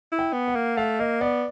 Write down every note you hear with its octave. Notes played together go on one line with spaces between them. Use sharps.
E4
G5
B3
F#5
A#3
A3 F5
A#3 D#5
B3 D5